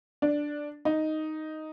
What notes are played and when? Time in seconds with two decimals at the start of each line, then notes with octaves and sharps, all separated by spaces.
0.22 D4
0.85 D#4